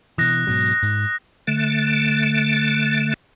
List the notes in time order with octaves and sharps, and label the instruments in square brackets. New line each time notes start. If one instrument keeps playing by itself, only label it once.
[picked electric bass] B2 E3 [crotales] D#6 F#6 A#6
[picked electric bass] G#2 B2 F#3
G#2
[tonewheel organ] D3 A3